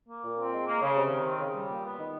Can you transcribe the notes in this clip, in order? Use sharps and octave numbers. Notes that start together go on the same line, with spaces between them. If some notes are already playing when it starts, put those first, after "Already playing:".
A#3
A#2
C4
G#3
A#3
C#3
C3
D#3
C4
C#3
G3
A#2
B3
D#3